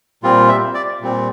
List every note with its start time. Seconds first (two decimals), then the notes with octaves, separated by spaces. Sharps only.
0.23 A#2 G3 C4 F4
0.49 E5
0.74 D5
1.01 A#2 G3 C4